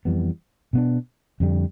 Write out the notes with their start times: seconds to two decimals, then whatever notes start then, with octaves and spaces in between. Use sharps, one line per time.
0.05 F2 E3 G3 B3
0.73 B2 B3 D4
1.40 F2 D3 G3